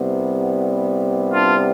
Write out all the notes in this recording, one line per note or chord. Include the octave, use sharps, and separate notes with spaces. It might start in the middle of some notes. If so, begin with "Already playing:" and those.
Already playing: C2 C3 G3 B3
D4 F4